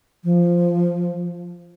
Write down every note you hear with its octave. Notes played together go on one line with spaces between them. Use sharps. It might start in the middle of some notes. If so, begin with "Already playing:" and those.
F3